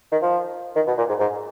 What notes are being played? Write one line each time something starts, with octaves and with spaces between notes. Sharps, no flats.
D#3
F3
D#3
B2
A#2
G#2
G#2